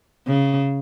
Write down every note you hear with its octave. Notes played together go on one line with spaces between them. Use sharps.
C#3